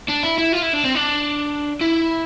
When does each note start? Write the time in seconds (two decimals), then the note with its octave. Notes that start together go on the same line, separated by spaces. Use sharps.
0.08 D4
0.23 E4
0.38 E4
0.53 F4
0.62 E4
0.74 D4
0.84 C4
0.95 D4
1.81 E4